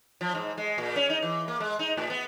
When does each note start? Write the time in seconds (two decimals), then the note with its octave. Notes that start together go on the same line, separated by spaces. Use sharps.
0.21 F3
0.35 G#2
0.58 G#3
0.78 A#2
0.96 C#4
1.10 D#4
1.22 E3
1.48 A#3
1.60 G#3
1.79 D#4
1.97 A2
2.10 B3